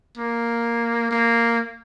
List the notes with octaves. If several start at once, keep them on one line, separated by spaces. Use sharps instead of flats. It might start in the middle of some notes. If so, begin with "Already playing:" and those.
A#3
A#3